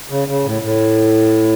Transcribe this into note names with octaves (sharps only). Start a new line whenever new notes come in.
C#3
C#3
A2
A2